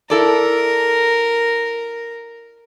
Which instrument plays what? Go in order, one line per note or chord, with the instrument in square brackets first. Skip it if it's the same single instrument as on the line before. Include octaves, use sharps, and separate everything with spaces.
[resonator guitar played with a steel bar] E4 A4 D5 [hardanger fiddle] A#4